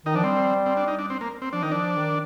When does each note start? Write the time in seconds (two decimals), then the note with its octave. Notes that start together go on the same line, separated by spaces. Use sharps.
0.05 D#3 D#4
0.15 F3 D4
0.23 G3 C4
0.66 C4
0.77 D4
0.88 D#4
0.99 D4
1.10 C4
1.21 A#3
1.42 C4
1.53 F3 D4
1.63 D#3 D#4
1.72 F3 D4
1.96 D#3